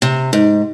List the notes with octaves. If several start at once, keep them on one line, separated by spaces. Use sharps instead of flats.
C3
G#2